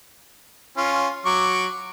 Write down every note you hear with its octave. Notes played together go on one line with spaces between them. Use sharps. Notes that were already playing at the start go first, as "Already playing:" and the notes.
C#4 F4
F#3 C#6 D6